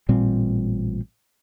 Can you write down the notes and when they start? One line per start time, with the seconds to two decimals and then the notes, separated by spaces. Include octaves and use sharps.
0.09 A1 A#2 G3 C4